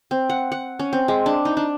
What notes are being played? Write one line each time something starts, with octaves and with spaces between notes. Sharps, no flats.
C4
F#5
F#5
C#4
C4
G#3
D4
D#4
D4